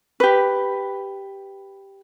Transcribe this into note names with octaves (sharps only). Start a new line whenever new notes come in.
G4 B4